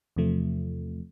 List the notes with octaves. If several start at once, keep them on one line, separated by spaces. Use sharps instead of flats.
E2 C3 F3 A3